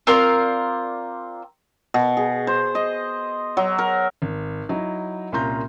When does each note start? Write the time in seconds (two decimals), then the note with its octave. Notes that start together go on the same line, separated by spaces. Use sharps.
0.07 C4 F4 A#4 D5
1.94 B2
2.17 G#4
2.47 C5
2.75 D#5
3.57 F#3
3.79 A#4
4.22 G#1
4.69 F#3 D#4 E4
5.32 C2 A#2 C#4 F4 A#5 G6